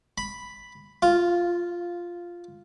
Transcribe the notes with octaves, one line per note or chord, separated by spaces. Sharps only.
B5
F4